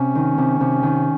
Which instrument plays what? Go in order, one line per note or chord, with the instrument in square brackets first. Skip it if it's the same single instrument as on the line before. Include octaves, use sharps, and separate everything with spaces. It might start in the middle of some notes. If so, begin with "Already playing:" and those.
Already playing: [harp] C3 [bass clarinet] C#4
[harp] D#3
C3
C3
D#3